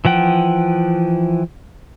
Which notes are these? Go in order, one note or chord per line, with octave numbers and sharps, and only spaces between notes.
E3 F3 F#5 G5